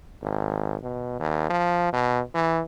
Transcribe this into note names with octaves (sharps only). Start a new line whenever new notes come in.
G#1
B2
D#2
F3
B2
E3